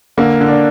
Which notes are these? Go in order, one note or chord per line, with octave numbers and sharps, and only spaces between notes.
D3 A#3
D3
D4